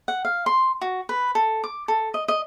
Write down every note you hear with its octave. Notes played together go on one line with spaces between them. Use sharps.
F#5
F5
C6
F#4
B4
A4
D6
A4
D#5
D#5